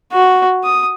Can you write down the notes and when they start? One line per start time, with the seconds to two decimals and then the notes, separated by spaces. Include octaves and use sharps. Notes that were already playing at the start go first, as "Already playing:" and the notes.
0.12 F#4
0.64 D#6